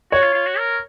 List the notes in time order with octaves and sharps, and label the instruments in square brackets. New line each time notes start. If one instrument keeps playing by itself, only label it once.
[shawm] F#4 [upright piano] C#5
[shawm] F4
F4
F#4
A#4